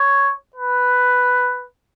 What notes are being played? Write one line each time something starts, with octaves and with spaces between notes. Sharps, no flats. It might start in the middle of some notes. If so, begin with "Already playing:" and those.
Already playing: C#5
B4